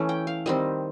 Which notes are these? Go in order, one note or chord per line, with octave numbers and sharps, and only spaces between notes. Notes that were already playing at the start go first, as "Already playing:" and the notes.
Already playing: E3 A3 C#4
G5
F5
D#3 G3 C4 D#5